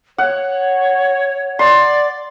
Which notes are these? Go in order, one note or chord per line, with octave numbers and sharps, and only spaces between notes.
C#5 F#5
D5 C6